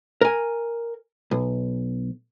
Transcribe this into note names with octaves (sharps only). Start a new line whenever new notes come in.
A#4 G#5
B1